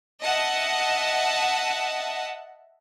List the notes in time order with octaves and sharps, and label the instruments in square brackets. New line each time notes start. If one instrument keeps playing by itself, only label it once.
[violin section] D#5 E5 F#5 A5